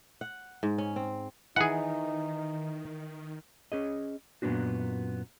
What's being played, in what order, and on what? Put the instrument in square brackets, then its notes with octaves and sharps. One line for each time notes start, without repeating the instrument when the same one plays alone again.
[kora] F#5
G#2
C#4
C4
[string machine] D#3 [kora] E3 [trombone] D#4 [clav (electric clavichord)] G#4 F#5
[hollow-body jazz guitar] C#4 G#4 D#5
F#2 A#2 B3 C#4 D4 F#4